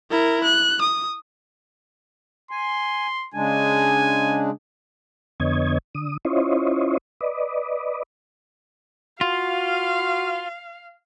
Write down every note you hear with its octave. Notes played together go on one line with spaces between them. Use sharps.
E4 A#4
F#6
D#6
G#5 C6
C#3 G#3 D4 G#5
F2 D3 B3 C#5 D#5 G#6
D3 D#6
C#4 E4 F4 C5 C#5 D#5
B4 D5 D#5
F4 F#4 F5